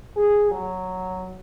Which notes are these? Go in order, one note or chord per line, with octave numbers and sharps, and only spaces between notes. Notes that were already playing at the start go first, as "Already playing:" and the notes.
G#4
F#3